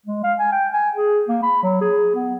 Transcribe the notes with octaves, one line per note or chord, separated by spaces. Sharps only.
G#3
F5
G#5
G5
G#5
G#4
A#3
B5
F#3
G#4
B3